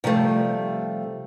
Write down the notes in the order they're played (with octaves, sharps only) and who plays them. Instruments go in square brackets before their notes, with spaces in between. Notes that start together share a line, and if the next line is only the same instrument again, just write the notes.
[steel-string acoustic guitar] C3 F3 G3 A3